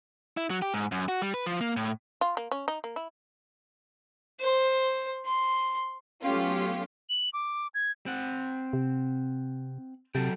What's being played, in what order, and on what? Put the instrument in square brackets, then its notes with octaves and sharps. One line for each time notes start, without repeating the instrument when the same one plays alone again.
[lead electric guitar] E4
F#3
G4
G#2
F#2
F#4
G3
B4
F3
A#3
A2
[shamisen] F4
A#3
C#4
D#4
A#3
E4
[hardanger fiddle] C5
C6
[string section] F#3 A3 B3 C#4 F4 G4
[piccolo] F#7
D6
G#6
[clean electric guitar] C4 F#5
[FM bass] C3
[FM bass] C3 [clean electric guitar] F#3 A4 G5